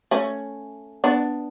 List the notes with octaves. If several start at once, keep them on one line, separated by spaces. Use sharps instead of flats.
A3 C#4
B3 D4